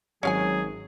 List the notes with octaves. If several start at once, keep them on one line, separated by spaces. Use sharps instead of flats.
G#1 F#3 C#4 G#4 F5 G#5